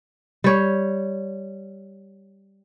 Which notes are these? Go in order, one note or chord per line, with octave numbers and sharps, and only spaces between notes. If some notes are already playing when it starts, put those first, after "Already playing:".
G3 C#5